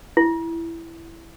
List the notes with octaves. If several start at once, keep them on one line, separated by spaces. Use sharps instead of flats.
E4